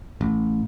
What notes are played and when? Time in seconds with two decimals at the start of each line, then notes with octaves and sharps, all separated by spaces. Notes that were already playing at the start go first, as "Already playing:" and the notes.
0.21 A1